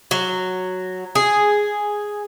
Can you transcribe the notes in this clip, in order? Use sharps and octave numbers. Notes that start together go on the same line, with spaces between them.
F#3
G#4